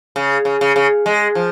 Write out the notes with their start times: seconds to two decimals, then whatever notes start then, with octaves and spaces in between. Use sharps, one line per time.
0.16 C#3
0.45 C#3
0.61 C#3
0.76 C#3
1.06 G#3
1.35 F3